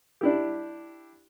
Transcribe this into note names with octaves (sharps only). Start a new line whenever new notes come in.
D4 E4 G4